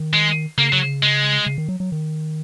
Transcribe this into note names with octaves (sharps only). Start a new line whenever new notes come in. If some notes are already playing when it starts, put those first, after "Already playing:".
Already playing: D#3
G#3
C#3 A#3
F#3
G#3
C#3
D#3
F#3
F#3
D#3